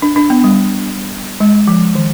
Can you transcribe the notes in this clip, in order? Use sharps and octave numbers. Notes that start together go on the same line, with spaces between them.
D4
D4
B3
G3
G#3
F3
D#3